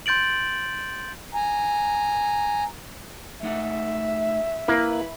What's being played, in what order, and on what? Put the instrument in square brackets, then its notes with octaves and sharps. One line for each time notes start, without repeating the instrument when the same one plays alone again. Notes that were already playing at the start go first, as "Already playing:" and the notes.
[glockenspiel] C6 G6 A6 D7 F#7
[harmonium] G#5 A#5
[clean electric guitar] A3 D#4 F#5 [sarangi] E5
[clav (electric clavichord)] A#3 [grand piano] E4 [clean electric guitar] B4 B5